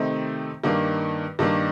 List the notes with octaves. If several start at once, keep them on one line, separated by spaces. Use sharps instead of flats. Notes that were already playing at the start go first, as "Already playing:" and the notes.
Already playing: C3 D#3 A3 C4 D#4
G2 D#3 A#3 D4
G2 D#3 A#3 D4